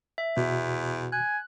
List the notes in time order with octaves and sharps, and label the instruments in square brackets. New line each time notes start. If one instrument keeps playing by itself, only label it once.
[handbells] E5
[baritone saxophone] E2 [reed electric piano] B2 F#4
[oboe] G#5 [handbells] F#6